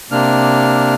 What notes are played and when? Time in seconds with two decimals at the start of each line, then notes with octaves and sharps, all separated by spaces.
0.11 C3 A#3 D4 F6